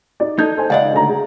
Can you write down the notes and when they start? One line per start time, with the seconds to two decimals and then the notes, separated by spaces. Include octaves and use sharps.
0.20 D#4 D5
0.39 D#4 A4 G6 G#6
0.57 A4 C5 G#5
0.70 C#2 D5 D#5 F5 F#5
0.93 D3 A3 A#5
1.08 G#4